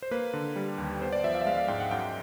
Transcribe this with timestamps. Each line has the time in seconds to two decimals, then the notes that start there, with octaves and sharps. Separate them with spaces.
0.02 C5
0.11 A#3 B4
0.33 D3
0.56 G3
0.78 D#2
1.01 B3 C5
1.12 D5
1.24 F3 E5
1.34 F5
1.42 E5
1.46 G#3 F5
1.57 F5
1.68 G#2 G5
1.80 F#5
1.91 F#2 G5